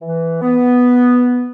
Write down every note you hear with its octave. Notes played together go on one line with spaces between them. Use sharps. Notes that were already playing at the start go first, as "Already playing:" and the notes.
E3
B3